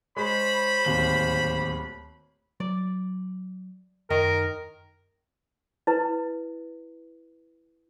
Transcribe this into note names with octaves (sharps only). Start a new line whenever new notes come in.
G#3 C5 C#5 B5
D1 D#2 F#7
F#3 D5
F#2 D#3 A#4 D#5
E4 B4